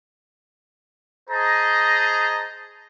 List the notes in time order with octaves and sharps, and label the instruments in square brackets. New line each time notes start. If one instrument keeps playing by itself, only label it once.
[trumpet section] G#4 C5 D#5 A5 A#5